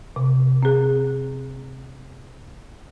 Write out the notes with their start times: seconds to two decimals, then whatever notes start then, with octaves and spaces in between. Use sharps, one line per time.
0.16 C3
0.63 C4 G#4